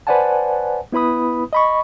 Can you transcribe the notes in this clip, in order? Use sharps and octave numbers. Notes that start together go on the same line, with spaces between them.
B4 C5 D5 F#5 G#5 A5
B3 E4 B4 B5 D#6
D#5 B5 C#6